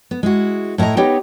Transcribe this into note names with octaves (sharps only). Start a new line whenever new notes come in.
B3
G#3 E4 F#4
A2 E4 A#4 D#5 A#5
B3 D#4 G4 B4 C#5 D#5